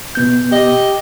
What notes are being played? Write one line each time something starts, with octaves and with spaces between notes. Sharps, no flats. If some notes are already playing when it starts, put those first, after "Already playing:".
B2 B3 G6
G4 D#5